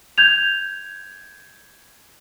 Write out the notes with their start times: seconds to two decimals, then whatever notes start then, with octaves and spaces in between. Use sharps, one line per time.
0.18 G6 G#6 F7